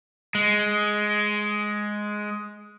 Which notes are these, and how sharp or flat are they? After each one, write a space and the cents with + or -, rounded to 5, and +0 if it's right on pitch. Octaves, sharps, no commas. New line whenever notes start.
G#3 +5